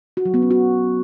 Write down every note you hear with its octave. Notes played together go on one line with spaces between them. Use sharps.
F#4
F#3
B3
C#4
F#4